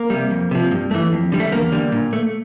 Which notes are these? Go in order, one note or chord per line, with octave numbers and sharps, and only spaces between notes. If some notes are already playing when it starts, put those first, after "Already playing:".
Already playing: A#3
C3 G3
F2
C3 F3
G2
E3 A3
F2
D3 G3
A3
E2 A#3
D3 G3
A#2
A3